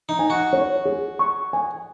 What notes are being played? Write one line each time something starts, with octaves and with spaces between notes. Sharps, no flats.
D#4
G#5
F#4
C#5
G#4
C#6
G#5